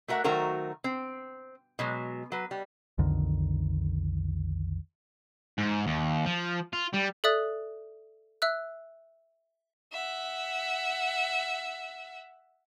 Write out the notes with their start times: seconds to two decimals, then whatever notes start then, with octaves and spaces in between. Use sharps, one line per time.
0.08 A3 F#4 A#4 E5 F#5
0.24 D#3 F#3 A3 F#4 A#4 C5
0.84 C4
1.79 B2 F#3 G#3
2.32 F#3 B4
2.51 G3
2.98 B1 F2 D3 D#3
5.58 G#2
5.87 D#2
6.26 F3
6.73 F4
6.94 G3
7.24 A4 D5 E5 D#6 F#6 A6
8.42 E5 E6 F#6
9.92 E5 F#5